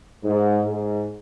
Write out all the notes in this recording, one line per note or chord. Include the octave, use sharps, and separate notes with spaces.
G#2
G#2